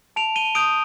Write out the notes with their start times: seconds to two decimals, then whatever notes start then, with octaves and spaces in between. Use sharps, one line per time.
0.16 A5 D7 F7
0.36 D#7 G7
0.55 D#6 G6 D7 F7